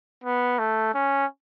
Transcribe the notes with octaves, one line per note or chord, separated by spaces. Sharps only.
B3
A3
C#4